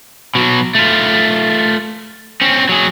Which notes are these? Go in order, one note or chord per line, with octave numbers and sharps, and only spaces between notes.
B2 F#3
A3 F4
C4 C#4
F#3 G#4